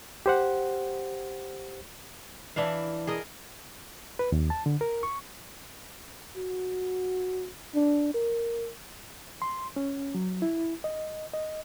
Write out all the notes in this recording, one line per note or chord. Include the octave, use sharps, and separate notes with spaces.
G4 C5 F#5
E3 D4 E4 F5
G#4 A#4 D#5
B4
D#2
A5
D3
A#4
C#6
F#4
D4
A#4
C6
C#4
F#3
E4
D#5
D#5